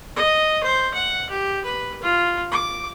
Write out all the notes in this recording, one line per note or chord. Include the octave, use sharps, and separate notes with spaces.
D#5
C5
F#5
G4
B4
F4
D6